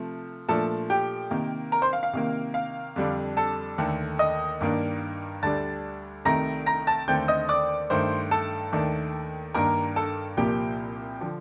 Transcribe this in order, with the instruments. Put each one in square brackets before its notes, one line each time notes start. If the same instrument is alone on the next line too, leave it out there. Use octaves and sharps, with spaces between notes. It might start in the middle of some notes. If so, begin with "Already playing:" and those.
Already playing: [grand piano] C3 F3 A3
A#2 F3 A3 D4 A4 A5
G4 G5
C3 D#3 A#3
A#4 A#5
C5 C6
F5
F5
C3 D#3 A#3
F5
F2 D3 G3 D4
A4 A5
D#2 D3 A3
D#5 D#6
G2 D#3 A#3 D4
D2 D3 G3 D4 A5 A6
C2 C3 D#3 A3 A#5 A#6
A#5 A#6
A5 A6
D#2 D3 A3 C4 G5 G6
D#5 D#6
D5 D6
G2 D#3 A3 C5 C6
A4 A5
D#2 D#3 A3 D4
G2 D#3 A#3 D4 A#4 A#5
A4 A5
C2 A#2 F3 A#3 G4 G5
D3 F3